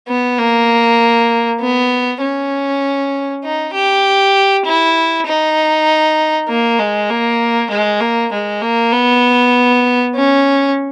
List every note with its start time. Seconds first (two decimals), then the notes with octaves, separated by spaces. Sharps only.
0.08 B3
0.38 A#3
1.61 B3
2.21 C#4
3.44 D#4
3.74 G4
4.65 E4
5.26 D#4
6.48 A#3
6.79 G#3
7.09 A#3
7.70 G#3
8.01 A#3
8.33 G#3
8.62 A#3
8.93 B3
10.15 C#4